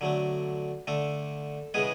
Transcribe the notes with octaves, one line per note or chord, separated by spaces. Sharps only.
D3 F#3 A3
D3 A3 A4
C#3 E3 G#3 B3 G#4